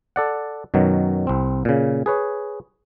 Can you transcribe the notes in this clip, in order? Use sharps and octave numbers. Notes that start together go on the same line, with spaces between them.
A4 D5 F#5
F#2 B2 D#3 F#3
C2 C4
A#2 C#3
G#4 B4 C#5